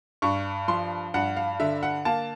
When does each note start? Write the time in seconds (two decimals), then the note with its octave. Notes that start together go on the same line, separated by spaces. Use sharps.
0.22 G2 C#6
0.68 F3 C6
1.14 G2 F#5
1.37 F5
1.60 D3 E5
1.83 F#5
2.05 A#3 A5